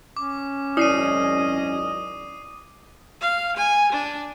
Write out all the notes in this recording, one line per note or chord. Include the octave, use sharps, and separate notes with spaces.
C#4 D6
G#1 F#2 E4 D5 D#5 D#6 C7 D#7
F5
G#5
D4